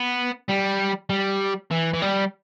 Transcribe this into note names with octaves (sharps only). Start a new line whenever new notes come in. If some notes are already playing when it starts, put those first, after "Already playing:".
Already playing: B3
G3
G3
E3
E3
G3